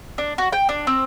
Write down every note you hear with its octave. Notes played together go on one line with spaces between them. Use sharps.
D4
F#4
G5
D4
C4